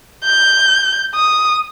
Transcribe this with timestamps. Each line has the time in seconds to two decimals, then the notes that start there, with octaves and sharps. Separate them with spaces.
0.25 G6
1.15 D#6